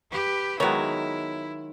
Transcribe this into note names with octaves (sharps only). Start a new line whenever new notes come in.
G4 B4
D#3 F#3 G#3 B3 E4 C#5